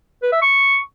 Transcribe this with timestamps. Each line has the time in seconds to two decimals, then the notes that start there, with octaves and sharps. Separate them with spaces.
0.22 B4
0.32 E5
0.42 C#6